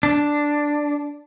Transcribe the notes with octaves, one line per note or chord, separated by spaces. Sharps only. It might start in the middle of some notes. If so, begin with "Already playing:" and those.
D4